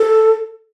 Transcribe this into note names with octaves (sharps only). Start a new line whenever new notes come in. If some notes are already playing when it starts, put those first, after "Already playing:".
Already playing: A4